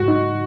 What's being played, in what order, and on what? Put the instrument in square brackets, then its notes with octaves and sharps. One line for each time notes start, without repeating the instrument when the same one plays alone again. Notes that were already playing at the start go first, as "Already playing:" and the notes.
Already playing: [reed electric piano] G#2 [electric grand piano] F#4
[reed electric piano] D#4